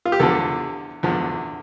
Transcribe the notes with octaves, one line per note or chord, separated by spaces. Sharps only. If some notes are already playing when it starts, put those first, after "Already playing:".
F4
G4
E2 D3 F3 A4
E2 D3 F3